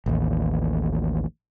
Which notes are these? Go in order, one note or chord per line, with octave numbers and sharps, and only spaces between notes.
A1 D#2